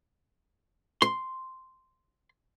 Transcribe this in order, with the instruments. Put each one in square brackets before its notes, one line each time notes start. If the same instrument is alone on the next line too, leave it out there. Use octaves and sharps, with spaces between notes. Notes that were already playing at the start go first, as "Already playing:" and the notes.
[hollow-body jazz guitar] C6